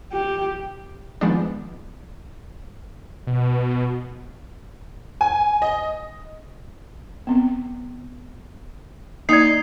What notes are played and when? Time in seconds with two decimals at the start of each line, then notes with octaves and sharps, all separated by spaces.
0.12 G4
1.21 D#3 F3 G#3 B3 C4 D4
3.27 B2
5.21 G#5
5.62 D#5
7.27 B3 C4
9.29 A#3 D#4 D5 G#6 C7